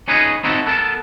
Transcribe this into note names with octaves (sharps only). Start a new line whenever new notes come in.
C#4 D#4 G#4 B4 C#5 D#5
C4 D#4 E4 F#4 A4
B3 A4 A#4 A5